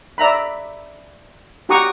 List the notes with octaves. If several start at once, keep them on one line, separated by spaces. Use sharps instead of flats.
D5 E5 A#5 B5
F#4 G4 F#5 A#5 C#6 D#6